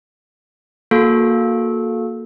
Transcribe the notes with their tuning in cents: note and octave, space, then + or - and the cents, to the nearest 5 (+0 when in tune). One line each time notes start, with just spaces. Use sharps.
A#3 +0 F#4 -30 A4 -20